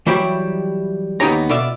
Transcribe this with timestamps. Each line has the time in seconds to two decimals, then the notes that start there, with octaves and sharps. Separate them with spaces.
0.07 E3 F#3 G3 E4 G4 C#5
1.20 D#2 B3 D#4 G4 C#5 A#5
1.49 B2 F4 D5 E5